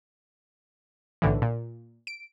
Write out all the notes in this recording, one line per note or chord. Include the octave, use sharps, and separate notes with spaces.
B1 A2 D3 E3
A#2
D7